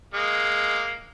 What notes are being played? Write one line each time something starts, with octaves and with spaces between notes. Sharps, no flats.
G#3 A#3